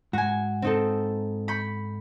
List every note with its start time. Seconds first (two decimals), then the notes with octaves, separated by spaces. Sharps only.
0.13 G#2 F#4 G#5
0.62 C4 D#4 A4
1.48 B5 C#6 G6